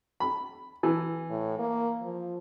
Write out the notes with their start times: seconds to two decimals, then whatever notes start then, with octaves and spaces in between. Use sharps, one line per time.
0.20 B5
0.83 E3
1.30 A2
1.59 A#3
2.02 F3